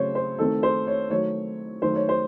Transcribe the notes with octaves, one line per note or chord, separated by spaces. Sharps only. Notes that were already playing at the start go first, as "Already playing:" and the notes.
Already playing: C#3 F#3 A3 C4 C5 C#5
C5
D#3 A3 C4 A4
C5
C#5
D#3 F#3 A3 C#5
D#3 F#3 A3 C5
C#5
C5